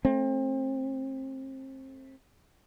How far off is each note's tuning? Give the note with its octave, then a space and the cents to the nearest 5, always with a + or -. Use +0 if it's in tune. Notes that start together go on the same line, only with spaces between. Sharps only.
A3 +0 C4 +30